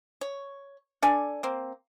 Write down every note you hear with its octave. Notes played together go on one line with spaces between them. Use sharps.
C#5
D4 A4 D5 G#5
A#3 C4